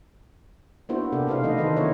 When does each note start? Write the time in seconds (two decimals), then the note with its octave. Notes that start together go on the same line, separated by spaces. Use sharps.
0.89 A#3 B3 D4 E4 F#4 C5
1.12 C3 D4 G4 A4
1.27 B2 D4 E4 B4 C5 F5
1.43 E3 A3 D#4 D#5
1.57 D3 D#3 D#4 A4 B4 C5
1.77 F#3 A#3 B3 E4 C5 C#5